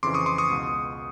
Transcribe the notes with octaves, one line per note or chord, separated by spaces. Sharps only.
F2 C#3 E3 C6 D6
C#6 D#6
C6 D6
C#6 D#6
C#2 B2